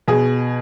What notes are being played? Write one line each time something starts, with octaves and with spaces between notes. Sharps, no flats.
B2 G#4